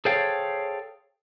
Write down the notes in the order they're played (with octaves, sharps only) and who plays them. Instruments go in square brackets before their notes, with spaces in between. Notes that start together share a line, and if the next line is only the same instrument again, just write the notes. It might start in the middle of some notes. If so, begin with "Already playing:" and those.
[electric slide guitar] G#4 A4 C5 C#5 F5 G5